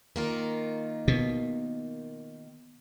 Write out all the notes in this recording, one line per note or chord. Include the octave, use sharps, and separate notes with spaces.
D#3 A#3 F4
B2